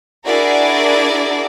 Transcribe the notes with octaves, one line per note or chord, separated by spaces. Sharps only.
D4 E4 F#4 G#4 A#4 D5